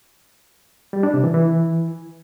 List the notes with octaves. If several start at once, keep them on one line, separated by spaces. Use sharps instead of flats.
G3
D4
C3
E3
E3